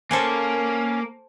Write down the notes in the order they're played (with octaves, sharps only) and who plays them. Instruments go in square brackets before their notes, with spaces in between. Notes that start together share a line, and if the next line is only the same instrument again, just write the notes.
[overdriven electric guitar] A#3 A#4 [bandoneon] C#4 [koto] A4 C5 G#5